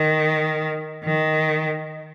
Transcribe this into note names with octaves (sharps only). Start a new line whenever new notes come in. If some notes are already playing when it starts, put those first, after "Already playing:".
Already playing: D#3
D#3